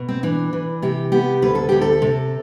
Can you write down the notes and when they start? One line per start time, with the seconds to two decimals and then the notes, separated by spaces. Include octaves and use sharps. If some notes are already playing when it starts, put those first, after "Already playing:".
Already playing: B2
0.09 C4
0.23 E3 D4
0.53 E3
0.82 C3 G4
1.12 B3 G4
1.42 D2 B4
1.55 A4
1.69 D2 G4
1.81 A4
2.02 C3